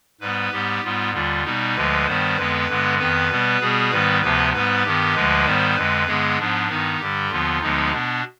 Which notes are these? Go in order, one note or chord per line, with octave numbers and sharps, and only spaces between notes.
G#2 G3 B3 B4
G#2 G3 B3 G4
G#2 G3 B3 F4
D#2 D3 G3 F4
B2 G3 B3 D#4
D2 D3 F3 G#3 B4
G2 D#3 G3 B3 C5
F2 D3 G#3 B3 B4
G2 D3 G#3 B3
F2 D#3 B3 B4
B2 G3 B3
B2 G3 B3 G#4
G#2 D#3 G3 B3 B4
D2 C3 F3 B3 B4
G#2 G3 B3 B4
G2 D#3 B3 G4
D2 D3 F3 G#3 B4
G#2 D#3 G3 B3 C5
F2 D3 G#3 B4
G2 D3 G#3 B3 G#4
G#2 F3 B3 D4
G2 D#3 B3 D#4
G2 D3 G3 G4
D#2 D3 F3 B3 F4
D2 D3 F3 G#3 B3 D#4
B2 B3 D4